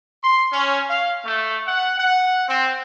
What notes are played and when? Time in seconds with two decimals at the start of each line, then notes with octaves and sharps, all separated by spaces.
0.23 C6
0.52 C#4
0.90 F5
1.25 A3
1.67 F#5
1.98 F#5
2.48 C4